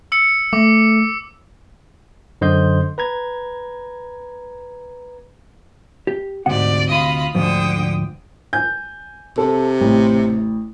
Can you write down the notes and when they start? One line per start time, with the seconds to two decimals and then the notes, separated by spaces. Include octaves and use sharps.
0.12 E6 C#7
0.53 A3 D6
2.41 F#2 D3 C5 D#5 C6 G6
2.98 B4 A#5 G#6
6.07 G4
6.46 D2 G#2 C3 D5 F#5
6.88 F4 D#5 B5
7.35 D2 G#2 D3 F3 G5 D#6
8.53 G#5 G6
9.38 C3 A4
9.81 A1